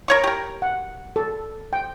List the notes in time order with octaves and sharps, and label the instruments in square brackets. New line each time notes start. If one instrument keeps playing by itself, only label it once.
[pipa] A#4 C#5 C#6
G4 A#4
[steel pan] F#5
A4
G5